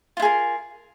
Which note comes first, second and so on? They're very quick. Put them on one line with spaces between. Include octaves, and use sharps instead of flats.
F4 E4 G#4 A#4